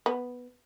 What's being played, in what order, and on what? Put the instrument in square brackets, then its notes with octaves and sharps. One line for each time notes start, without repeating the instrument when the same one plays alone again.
[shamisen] B3